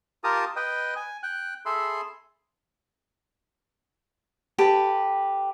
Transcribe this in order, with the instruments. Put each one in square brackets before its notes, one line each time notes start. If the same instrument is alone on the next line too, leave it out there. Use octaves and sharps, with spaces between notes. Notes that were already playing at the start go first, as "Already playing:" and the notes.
[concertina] F4 G4 A#4 A5 A#5 D#6
B4 D#5 G5
G#5
G5 F#6
G#4 A4 E5 B5 C6
[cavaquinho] G4 A4 B4 G5